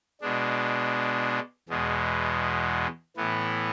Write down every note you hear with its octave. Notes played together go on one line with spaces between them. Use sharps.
B2 G#3 D4
E2 B2 G#3
A2 E3 B3